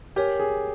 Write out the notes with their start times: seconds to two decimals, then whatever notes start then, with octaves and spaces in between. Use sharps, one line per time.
0.16 G4 A#4 C#5 G#5
0.39 G#4